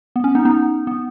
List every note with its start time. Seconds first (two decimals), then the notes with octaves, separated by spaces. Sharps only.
0.16 B3
0.24 C#4
0.35 B3 D#4
0.45 B3 D#4
0.87 B3